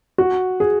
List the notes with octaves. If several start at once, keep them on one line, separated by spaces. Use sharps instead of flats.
F#4
G#4